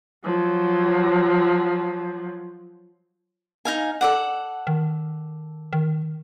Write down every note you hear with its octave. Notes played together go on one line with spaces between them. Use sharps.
F3 F#3
D#4 F5 G#5
A4 D5 F#5
D#3
D#3